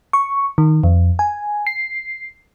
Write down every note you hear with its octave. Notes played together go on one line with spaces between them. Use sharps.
C#6
D#3
F2
G#5
C7